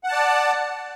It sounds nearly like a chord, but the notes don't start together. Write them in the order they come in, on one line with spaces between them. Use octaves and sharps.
F#5 A5 D5